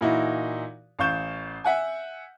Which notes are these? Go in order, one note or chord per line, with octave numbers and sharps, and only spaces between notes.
A#2 E3 D#4 E4 F#4
A1 F5 C#6 G6 E7
E5 F#5 G#5